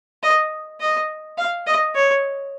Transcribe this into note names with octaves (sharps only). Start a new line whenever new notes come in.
D#5
D#5
F5
D#5
C#5